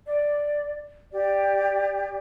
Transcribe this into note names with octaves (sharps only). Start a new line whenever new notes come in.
D5
G4 D5